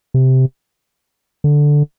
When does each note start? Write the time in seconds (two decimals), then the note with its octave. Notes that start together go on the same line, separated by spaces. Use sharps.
0.14 C3
1.44 D3